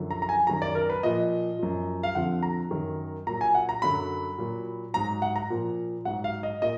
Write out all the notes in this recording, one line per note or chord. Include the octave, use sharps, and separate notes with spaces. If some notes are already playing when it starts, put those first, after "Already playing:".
Already playing: F#2 D3 F3
A#5
A#5
G#5
F#2 D#3 F#3 A#5
D5
A#4
B4
A#2 F3 D#5
F#2 F3
F5
F2 D3 F3 F#5
A#5
F#2 D#3 F#3
A#2 F#3 A#5
G#5
F#5
A#5
F#2 D3 F#3 B5
A#2 F#3
G#2 F#3 A#5
F#5
A#5
A#2 F3
G#2 F#3 F#5
F5
D#5
A#2 D#5